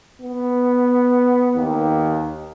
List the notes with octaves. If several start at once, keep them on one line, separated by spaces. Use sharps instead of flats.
B3
D#2